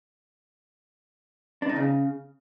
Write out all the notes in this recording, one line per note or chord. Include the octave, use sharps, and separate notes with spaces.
D4
D#4
C#3